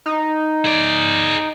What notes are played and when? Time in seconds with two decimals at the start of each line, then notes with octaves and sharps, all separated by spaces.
0.06 D#4
0.65 G#4 D5